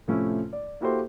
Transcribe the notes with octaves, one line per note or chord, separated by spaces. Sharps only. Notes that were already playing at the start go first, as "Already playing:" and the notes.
A2 C3 F3 A3 C#4 E4
D5
A#3 E4 F#4 G4 A4 C5